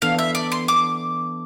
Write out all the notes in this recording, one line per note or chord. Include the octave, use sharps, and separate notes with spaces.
E3 B3 D4 A4 F5
E5
D5
C6
D6